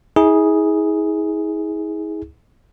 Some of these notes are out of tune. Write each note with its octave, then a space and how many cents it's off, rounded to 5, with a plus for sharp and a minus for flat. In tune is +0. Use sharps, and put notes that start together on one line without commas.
E4 -45 G#4 +0